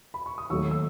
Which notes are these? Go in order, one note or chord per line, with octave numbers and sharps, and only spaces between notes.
B5
C#6
D#6
D#2 D#3 F#3 A3 C#6 E6
E6